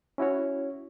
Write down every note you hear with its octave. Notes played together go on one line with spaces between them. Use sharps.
C#4 E4 F#4 C#5